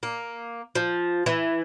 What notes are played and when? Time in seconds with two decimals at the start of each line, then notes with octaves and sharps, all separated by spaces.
0.03 A#3
0.75 F3
1.26 E3